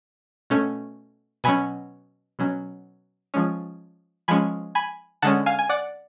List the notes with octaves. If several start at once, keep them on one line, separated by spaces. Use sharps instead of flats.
B2 A3 C#4
B2 F#3 C#4 G#5 B5
B2 F#3 C#4
F3 G#3 C#4
F3 G#3 C#4 G#5 B5
G#5 B5
D3 G#3 C#4 F#5 A5
F5 G#5
G#5
D5 F#5